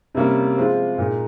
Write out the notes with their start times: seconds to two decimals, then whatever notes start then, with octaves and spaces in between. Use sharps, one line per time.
0.15 C3 G3 A#3 C#4
0.57 F3 G#3 C4 F4
0.98 A#2 G#3 D#4